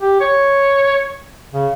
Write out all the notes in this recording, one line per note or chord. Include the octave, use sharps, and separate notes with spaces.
G4
C#5
C#3